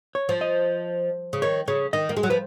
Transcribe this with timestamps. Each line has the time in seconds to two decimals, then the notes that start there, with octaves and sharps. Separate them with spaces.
0.15 C#5
0.29 F3
0.41 D#5
1.33 C#3
1.42 D#3 C#5
1.68 C#3 C#5
1.93 D#3 D#5
2.09 A#3
2.17 G#3
2.23 F#3
2.30 F3 B4